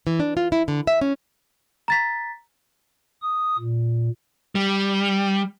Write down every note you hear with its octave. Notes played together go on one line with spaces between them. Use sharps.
E3
D4
F4
E4
D3
E5
C#4
A#5 A6 B6
D#6
A#2
G3